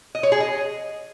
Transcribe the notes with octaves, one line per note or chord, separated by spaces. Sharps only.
D#5
C#5
G#4
D#5